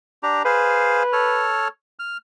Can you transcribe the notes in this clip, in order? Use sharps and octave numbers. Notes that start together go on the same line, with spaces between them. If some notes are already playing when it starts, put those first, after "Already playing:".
D4 G4 A#5
G#4 B4 C5 F5
A4 C#5 F6
F6